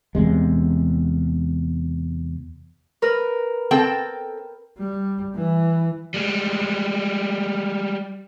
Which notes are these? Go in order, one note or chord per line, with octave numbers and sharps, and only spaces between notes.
E2 C3 G#3
A#4 B4
C4 A4 G5
G3
E3
G3 G#3